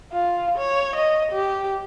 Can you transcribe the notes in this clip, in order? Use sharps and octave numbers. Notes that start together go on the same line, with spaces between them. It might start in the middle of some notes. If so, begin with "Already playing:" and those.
F4
C#5
D#5
G4